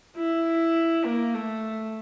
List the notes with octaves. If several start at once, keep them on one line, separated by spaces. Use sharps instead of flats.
E4
A#3
A3